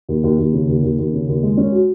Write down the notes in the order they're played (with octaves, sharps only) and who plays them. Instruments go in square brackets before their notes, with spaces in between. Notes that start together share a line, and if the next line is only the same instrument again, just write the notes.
[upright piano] D#2
D#2
D#2
C#3
D#2
D#2
D#2
C#3
D#2
G#3
C#4
F#4